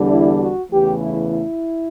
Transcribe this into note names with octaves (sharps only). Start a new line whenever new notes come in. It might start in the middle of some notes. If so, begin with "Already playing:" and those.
Already playing: E2 D3 G3 D4
E4
F#4
E2 C#3 E3 A3 G4
E4
E4